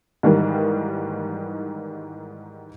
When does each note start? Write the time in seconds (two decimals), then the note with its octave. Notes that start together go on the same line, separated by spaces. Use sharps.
0.23 G#2 D#3 E3 G3 A#3